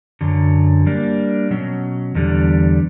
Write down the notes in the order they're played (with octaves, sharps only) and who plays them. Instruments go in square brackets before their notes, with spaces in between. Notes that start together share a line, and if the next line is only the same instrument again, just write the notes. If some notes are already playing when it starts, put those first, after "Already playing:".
[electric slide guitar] F#2 D3 F#3
G3 A#3 D4
B2 F#3 C#4
E2 D3 G3